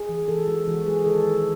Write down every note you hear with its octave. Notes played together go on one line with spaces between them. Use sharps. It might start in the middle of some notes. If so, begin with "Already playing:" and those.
Already playing: G#4
E3
E3 A4
G#3 F#4
E3 F#4
G#3 G#4
D#3 A4
D#3